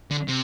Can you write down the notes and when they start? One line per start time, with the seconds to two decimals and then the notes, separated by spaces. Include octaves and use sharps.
0.11 D3
0.28 C3